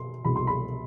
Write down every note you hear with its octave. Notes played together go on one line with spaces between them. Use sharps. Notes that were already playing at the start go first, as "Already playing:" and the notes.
Already playing: B2 C6
C2 B2 B5
C6
B5